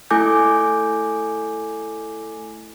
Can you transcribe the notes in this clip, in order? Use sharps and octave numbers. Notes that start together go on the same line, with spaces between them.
A3 E4 A4 G#5 D6 G6